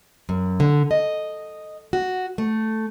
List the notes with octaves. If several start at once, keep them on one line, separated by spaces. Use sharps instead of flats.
F#2
D3
D#5
F#4
A3